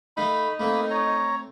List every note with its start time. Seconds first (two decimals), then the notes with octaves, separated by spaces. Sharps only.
0.17 A3 D#4 F5 B5
0.60 A3 A#3 C4 B5
0.91 C#5 A#5